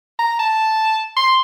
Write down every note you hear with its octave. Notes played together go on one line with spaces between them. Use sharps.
A#5
A5
C6